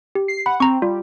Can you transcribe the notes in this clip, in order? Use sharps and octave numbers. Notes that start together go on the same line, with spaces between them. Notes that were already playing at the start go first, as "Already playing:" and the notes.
G4
C7
F#5 B5
C4 A#5 C#6
G3 F4